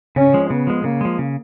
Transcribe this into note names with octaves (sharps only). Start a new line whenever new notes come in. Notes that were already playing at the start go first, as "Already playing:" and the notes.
C#3 C#4
F3 G#3
C#3 B3
F3 G#3
C#3 A#3
F3 G#3
C#3